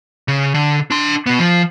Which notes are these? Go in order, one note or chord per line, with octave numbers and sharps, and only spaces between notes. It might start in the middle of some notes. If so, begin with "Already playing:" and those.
C#3
D3
D4 C6
B2 B3
F3